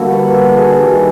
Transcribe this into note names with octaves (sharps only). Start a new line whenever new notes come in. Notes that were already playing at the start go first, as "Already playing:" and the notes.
Already playing: D3 G3 A#3 E4 F#4 A4
B4
G#4
D#3 G3 G4